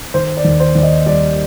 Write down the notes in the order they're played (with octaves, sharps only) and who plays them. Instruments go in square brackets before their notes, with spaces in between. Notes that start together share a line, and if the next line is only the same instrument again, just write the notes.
[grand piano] D#3 C5
D5
D#2
C5
D#2 D5
D#5
G3 D5